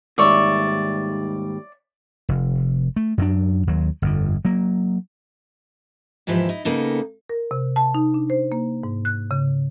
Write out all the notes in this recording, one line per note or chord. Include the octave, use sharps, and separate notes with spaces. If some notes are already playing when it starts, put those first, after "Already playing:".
D#2 G#2 G3 C#5 D5 E5
F1
A3
F#2 F#3 D4
D#2 F#3
G1 F2 D3
F#3 A#3
D#2 G#2 E3 F3 E4 G4
D#4 E4
C#3 A#3 B3 D#4 A4
A#4
C3
A5
D#4
D4
C5
A#3
G#2
F#6
C#3